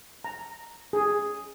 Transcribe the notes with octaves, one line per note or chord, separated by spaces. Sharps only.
A#5
G#4